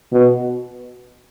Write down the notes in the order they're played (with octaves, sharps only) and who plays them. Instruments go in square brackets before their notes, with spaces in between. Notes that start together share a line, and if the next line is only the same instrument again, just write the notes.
[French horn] B2